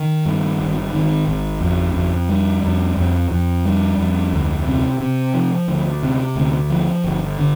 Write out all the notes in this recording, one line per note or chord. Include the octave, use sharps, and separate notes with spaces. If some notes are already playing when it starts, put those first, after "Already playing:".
Already playing: D#3
G2
G#1
D#3
G#1
F2
F2
G3
F2
F2
F2
G3
F2
D2
C3
C3
F3
D2
C3
D2
F3
G1
D3